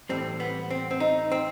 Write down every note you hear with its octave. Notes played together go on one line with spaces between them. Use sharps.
A2 E3 G3 C4
B3
C4
C4
D#4
C4